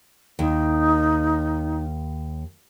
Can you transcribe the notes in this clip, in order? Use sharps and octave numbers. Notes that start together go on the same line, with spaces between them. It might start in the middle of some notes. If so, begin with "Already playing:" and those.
D#2 D#4